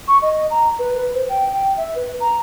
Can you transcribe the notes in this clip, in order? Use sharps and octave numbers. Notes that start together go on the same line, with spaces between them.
C#6
D#5
A#5
B4
B4
C5
G5
G5
E5
B4
A#5